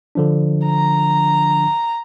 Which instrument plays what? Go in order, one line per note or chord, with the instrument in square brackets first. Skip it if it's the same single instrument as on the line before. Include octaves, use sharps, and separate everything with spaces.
[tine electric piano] D3 F3 D4
[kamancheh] A#5